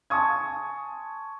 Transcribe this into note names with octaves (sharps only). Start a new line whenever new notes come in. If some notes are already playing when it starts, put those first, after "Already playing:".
G#5 A5 C6 C#6 D#6 G#6